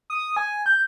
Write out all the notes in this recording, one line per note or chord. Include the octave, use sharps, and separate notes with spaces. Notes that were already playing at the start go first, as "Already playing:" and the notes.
D#6
G#5
G6